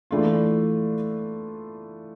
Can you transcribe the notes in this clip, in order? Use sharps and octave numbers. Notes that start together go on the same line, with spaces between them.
E3 A3 D4 F4